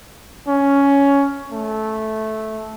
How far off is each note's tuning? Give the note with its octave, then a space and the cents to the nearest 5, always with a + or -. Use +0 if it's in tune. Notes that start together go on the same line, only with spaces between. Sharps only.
C#4 +10
A3 -10